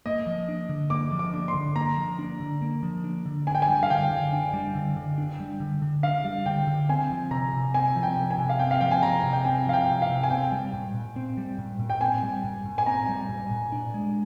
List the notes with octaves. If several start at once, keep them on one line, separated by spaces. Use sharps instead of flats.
A#3 D#5
F3
D4
D3
A#3 D6
F3
D6
D4
C6
D3
A#3 A#5
F3
D4
D3
A#3
F3
D4
D3
D4 G#5
G5
G#5
G3
F5
D3 G5
D3
D4
G3
D3
D3
D4
G3
D3
D3
D4 F5
G3
D3 G5
D3
C4 G#5
F3
C3 A#5
C3
C4 G#5
F3
G5
C3
G#5
C3
F5
C4 G5
F5
F3 G5
G#5
C3 A#5
C3
G5
C4 G#5
F3 F5
G5
C3
F5
C3
G#5
C4 G5
G3
A#2
A#2
C4
G3
A#2
A#2
G5
C4 G#5
G3
A#2
A#2
G#5
C4 A#5
G3
A#2
A#2
D4
G#3